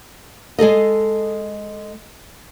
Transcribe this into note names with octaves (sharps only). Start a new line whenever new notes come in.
G#3 G#4 A4 D#5